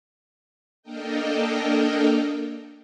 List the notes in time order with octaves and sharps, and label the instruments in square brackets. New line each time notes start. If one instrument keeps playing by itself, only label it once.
[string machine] A#3 D4 A4 A#4 D#5 G5